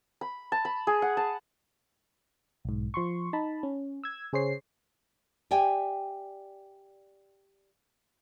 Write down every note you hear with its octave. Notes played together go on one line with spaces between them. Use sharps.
B5
A5
B5
G#4
F#5
A5
B1 G#2
F3 C6 C#6
D#4 A5 B5
C#4
E6 G#6
C#3 G#4 C5 C#5 C7
G4 D5 E5 G5 G#5